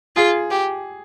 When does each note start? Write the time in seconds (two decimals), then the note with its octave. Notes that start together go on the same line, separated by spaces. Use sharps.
0.16 F4 G#4
0.51 G4